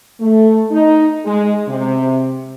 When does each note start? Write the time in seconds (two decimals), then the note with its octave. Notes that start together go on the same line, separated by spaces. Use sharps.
0.20 A3
0.71 D#4
1.24 G#3
1.67 C3